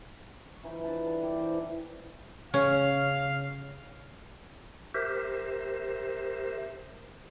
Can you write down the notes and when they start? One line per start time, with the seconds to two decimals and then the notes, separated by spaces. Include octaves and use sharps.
0.45 C#6
0.63 E3 D#4 F4
0.84 E3 D4 B4 A5
1.06 G3 A4 A5
1.23 E4 G4 A#4 D5
1.38 E3 C5 G5
2.54 C#3 C#4 F5
4.95 G4 A#4 C5 E5